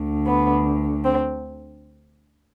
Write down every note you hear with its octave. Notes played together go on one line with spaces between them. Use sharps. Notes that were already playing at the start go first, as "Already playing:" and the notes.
Already playing: D2 D3
B3
C4